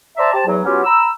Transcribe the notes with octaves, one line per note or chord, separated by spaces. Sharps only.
C5 D5 E5 A5 A#5
G4 C5 A5
E2 F#3
F#3 B3 C#4 F4 G4
A#5 B5 E6